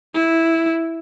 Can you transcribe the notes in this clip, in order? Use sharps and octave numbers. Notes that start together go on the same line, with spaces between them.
E4